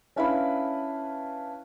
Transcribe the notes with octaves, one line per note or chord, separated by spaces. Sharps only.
C#4 D4 E4 B4 F5 B5